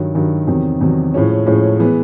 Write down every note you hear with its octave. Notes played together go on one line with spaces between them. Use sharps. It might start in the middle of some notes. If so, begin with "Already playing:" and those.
Already playing: G2 D#3 F#3
G2 D#3 F#3
E2 C3 D#3 F#3
E2 C3 D#3 F#3
A2 F3 G#3 C#4
A2 F3 G#3 C#4
E3 G#3 B3